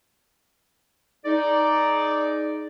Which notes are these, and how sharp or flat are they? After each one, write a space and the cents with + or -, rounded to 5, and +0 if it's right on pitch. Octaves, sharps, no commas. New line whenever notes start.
D#4 +0 G#4 +25 D5 +0